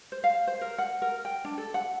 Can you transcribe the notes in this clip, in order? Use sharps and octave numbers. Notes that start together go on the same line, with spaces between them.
C5
F5
C5
A#4
F#5
A#4
G5
D4
A4
F#5